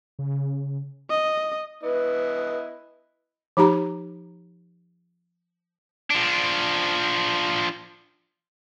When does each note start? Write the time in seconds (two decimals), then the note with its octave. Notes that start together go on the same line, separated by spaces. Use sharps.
0.19 C#3
1.10 D#5
1.83 B3 E4 B4 D#5
3.57 F3 D#4 G4 A#5
6.10 F3 D4